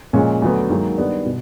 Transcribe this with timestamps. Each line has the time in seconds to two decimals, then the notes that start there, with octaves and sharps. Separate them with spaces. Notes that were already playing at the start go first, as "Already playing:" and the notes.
0.13 A#2 F3 G#3 C#4
0.42 D2 D3 F#3 B3
0.69 G#2 D#3 F#3 A#3 D#4
0.98 D#3 G3 B3 D4
1.26 B2